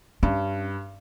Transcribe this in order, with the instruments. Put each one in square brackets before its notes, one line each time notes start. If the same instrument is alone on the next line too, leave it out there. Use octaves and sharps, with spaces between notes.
[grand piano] G2 [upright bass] C#4